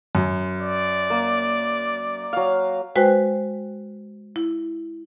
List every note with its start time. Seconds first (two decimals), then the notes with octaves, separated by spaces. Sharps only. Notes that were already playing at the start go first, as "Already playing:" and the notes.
0.15 F#2
0.61 D5
1.10 A#3
2.33 F#3 F5
2.96 G#3 F#4 B4 C5 G5
4.36 E4